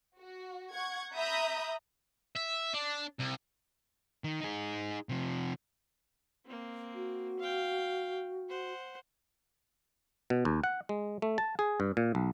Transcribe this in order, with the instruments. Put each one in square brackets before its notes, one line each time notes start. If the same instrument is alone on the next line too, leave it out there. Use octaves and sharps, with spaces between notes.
[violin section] F#4
F#5 C#6 G#6
E5 A#5 B5 D#6 G6
[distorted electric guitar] E5
D4
C2
[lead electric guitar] D#3
D#4 G#4
C3 F3
[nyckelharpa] A#3 C4
[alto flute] F#4
[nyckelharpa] F5 G5
C5 F#5
[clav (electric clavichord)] B2
D#2
F#5
G#3
A3
A5
G#4
G2
A#2
B1